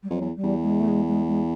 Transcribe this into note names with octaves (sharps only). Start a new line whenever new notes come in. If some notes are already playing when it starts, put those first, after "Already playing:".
G3
F2 F#3
E2
G3
E2
G#3
A3
G#3
G#3
G#3